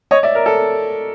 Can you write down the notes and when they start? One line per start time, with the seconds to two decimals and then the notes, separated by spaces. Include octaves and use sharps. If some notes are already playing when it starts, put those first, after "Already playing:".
0.11 C#5 D#5
0.23 D5 E5
0.35 A#4
0.46 A4